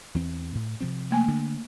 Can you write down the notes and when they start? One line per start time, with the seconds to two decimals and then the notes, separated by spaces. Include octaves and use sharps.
0.15 E2 E3 C4
0.55 A2
0.81 C3 F3 C4
1.11 A3 A#3 G#5
1.28 D3